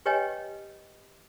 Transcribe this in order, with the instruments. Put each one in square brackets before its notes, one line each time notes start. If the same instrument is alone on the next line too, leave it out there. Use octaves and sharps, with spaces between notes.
[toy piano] G4 B4 C#5 D#5 G5 G#5